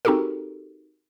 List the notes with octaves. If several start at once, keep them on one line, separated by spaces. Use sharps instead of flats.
C4 D#4 F#4 G4 A4 A#4